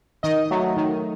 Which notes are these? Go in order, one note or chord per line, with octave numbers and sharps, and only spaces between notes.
D#3 D#5
F#3 A3
D#3